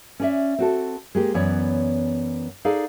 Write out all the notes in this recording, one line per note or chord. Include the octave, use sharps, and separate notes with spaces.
C#4 D5 E5
C4 F#4 A4
G#3 A#3 G4
F#2 E3 B3 C#5 D5
D#4 G#4 A4 D5 F5